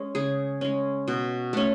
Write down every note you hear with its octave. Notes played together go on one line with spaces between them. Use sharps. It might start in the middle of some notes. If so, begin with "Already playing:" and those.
Already playing: G#3 C#4
C#3 G#4
G#3 C#4
B2
A3 C#4